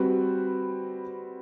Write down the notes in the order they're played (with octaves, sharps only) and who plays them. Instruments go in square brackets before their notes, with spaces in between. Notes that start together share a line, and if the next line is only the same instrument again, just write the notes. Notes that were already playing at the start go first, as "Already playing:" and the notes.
Already playing: [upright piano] G3 C4 F#4 B4